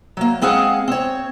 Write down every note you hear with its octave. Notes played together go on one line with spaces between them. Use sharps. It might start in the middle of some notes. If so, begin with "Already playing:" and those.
F#3 A#3
G#3 C4 G#4 F5 F#5
C4 C#5